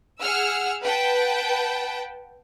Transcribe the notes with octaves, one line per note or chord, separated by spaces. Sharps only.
G#4 F#5 E6 F6
B4 F#5 G5 A5